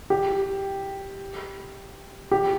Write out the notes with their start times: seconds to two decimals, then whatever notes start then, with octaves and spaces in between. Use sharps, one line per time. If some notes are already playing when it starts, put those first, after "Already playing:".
0.10 G4
2.31 G4